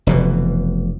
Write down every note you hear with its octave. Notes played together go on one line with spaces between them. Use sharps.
F1 B2 E3